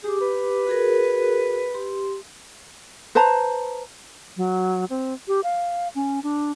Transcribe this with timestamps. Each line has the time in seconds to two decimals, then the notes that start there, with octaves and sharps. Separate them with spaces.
0.04 G4 G#4 D6
0.21 B4
0.67 F#4 G#4 A#4
1.74 G4 C6
3.15 B4 C5 A5 A#5
4.37 F#3
4.90 C4
5.28 G4
5.44 F5
5.95 C#4
6.23 D4